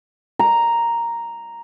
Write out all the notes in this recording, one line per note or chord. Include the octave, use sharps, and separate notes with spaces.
A#5